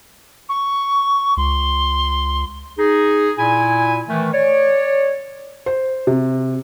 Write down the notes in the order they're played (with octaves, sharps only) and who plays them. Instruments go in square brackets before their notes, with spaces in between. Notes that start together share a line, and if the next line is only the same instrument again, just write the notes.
[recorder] C#6
[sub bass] C#2 [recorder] C6
[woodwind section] D#4 G#4
A#2 E4 G#5
D#3 E3 A3
C#5 D5
[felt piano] C5
C3